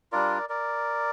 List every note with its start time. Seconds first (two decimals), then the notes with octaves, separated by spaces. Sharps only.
0.12 G3 D4 F4 A#4 D5
0.49 A#4 D5